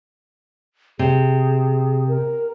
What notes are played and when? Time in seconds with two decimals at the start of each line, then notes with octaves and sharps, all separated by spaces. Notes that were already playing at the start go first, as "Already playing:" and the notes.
0.99 C3 G#4
2.08 A#4